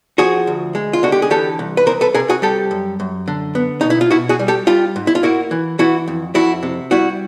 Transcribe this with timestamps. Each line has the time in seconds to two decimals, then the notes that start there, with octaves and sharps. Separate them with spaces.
0.18 F3 F#4 G#4
0.47 D2
0.75 G#3
0.93 F4
1.03 D3 F#4
1.12 G4
1.22 G#4
1.30 E3 G4 A4
1.59 C2
1.77 B4
1.86 C2 A#4 C5
2.01 A4 B4
2.14 C3 G#4 A#4
2.29 F#4 G#4
2.42 G3 G4 A4
2.71 F#2
3.00 F#2
3.28 D3
3.55 B3
3.81 B2 D#4
3.90 E4
4.01 F4
4.10 B2 E4 F#4
4.29 F#4 G#4
4.39 G3
4.48 G4 A4
4.67 G3 F4 G4
4.96 G#2
5.07 E4
5.15 F4
5.23 A#3 E4 F#4
5.51 E3
5.79 E3 E4 F#4
6.08 F2
6.35 F2 E4 F#4
6.63 C3
6.91 G3 E4 F#4